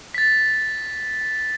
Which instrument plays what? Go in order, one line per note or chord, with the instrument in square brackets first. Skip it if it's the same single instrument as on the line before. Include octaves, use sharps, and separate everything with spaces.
[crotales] A6 B6